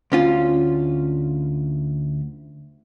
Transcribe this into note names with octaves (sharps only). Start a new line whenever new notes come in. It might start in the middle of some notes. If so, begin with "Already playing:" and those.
D2 C#4 F4